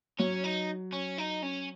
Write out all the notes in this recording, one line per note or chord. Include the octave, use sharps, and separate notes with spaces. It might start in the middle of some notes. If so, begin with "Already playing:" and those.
F#3 C#4
D#4
C#4
D#4
C#4